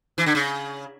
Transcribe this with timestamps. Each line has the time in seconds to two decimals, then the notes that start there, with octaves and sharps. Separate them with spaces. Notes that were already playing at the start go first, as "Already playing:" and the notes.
0.18 E3
0.26 D3
0.35 C#3